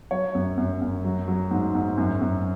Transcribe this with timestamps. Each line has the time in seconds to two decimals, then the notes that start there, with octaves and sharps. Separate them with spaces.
0.11 F#3 C#5
0.35 F#2
0.57 F#2
0.81 F#2
1.05 F#3
1.28 F#3
1.51 G#2
1.75 G#2
1.97 F#2
2.21 F#2